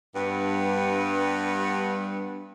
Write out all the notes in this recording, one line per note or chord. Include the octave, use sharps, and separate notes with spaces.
G2 B3